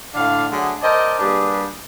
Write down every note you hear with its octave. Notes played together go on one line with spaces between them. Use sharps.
A2 D3 D4 F5
D3 F#3 A3 D4 G#4
A#4 C5 D5 D#5 G5 A5
G3 A#3 D4 G4 G#4 B4